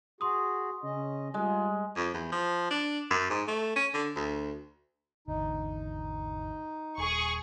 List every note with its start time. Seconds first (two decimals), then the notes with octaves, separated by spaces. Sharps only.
0.21 F#4 G#4 C6 D#6
0.83 C#3 C#4 D#5
1.34 G3 G#3 F4
1.97 F2
2.14 E2
2.32 F3
2.71 D4
3.11 F#2
3.30 G#2
3.48 A3
3.76 C#4
3.94 D3
4.16 D2
5.28 G#1 E2 D3 D#4
6.98 D#1 G#4 C#6